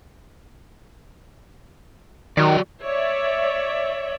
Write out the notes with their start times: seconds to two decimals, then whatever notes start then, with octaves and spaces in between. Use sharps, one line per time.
2.37 D#3 F#3 F#4 D5
2.82 C#5 D5 E5